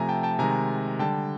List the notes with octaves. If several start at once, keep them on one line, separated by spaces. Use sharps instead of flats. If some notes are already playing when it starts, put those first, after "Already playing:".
Already playing: C3 F3 A3 G#5 A#5
G5 A5
G5 A5
C3 D#3 G#3 G#5 A#5
D3 G3 G5 A5